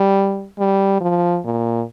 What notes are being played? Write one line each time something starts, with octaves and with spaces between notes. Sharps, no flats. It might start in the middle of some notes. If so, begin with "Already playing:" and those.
Already playing: G3
G3
F3
A#2